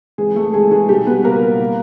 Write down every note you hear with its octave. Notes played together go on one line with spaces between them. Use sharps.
C3 E3 G#3 G#4
A3 A4
C3 E3 G#3 G#4
G#3 G#4
B2 G3 G4
B3 B4
B2 A#3 A#4
B2